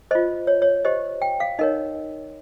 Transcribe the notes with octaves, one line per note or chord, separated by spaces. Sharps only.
F4 C5 D#5
C#5
C#5
G4 C5 D#5
G5
F5
D#4 A#4 C#5 D#5